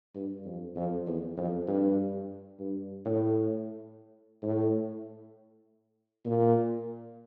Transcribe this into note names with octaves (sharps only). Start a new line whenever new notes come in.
G2
F2
F2
E2
F2
G2
G2
A2
A2
A#2